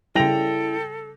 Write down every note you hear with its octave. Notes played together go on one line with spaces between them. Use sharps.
C#3 G3 E4 A4 G5 A#6 F7